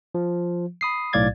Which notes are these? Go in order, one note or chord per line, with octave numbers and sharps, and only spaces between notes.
F3
B5 D#6 C7
B1 A2 D5 F5 G#6 A6